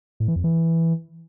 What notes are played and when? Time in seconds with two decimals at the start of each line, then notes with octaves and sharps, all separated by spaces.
0.20 A2
0.28 E3
0.36 F2
0.44 E3